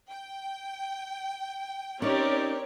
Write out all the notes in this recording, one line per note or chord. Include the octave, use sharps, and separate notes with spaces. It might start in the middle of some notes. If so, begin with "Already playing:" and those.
G5
C4 C#4 D#4 G4 A#4 C#5 D5